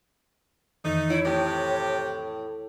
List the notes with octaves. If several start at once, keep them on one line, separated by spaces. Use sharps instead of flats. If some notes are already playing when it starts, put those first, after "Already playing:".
F2 D#3 E3 A3 D#4
E4 C#5
A2 C3 G4